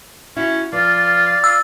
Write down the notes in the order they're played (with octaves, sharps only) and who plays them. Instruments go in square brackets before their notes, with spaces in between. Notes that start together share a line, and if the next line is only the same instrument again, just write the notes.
[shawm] C#4 [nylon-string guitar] E4 F#4
[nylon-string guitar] F3 B4 [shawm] F4 [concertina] D5 F5
[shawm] F4 [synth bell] E6